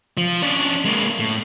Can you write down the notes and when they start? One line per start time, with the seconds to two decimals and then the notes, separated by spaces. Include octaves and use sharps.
0.17 F3
0.42 C#4 D4
0.85 G#3 A#3
1.20 A2